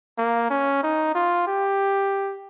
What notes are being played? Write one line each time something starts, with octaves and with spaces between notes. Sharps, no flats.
A#3
C#4
D#4
F4
G4